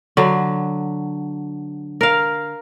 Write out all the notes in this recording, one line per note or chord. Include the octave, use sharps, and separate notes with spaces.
D3 F#3
A#4 F5